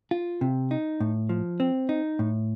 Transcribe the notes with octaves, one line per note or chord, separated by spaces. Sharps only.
F4
C3
D#4
A2
F3
C4
D#4
A2